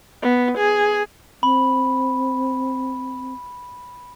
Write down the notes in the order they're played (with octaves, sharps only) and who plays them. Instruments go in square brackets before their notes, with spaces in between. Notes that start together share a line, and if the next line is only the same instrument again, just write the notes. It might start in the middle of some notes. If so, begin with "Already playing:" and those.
[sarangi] B3
G#4
[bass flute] C4 [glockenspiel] B5